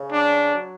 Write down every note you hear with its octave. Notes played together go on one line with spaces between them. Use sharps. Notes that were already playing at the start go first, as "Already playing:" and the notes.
Already playing: C#3
D4
F#3